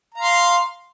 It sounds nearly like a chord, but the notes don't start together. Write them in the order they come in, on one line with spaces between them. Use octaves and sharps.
A#5 F5 C6